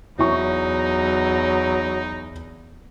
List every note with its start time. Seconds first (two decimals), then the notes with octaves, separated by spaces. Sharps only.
0.19 E2 F#3 D#4 E4 C#5 C#6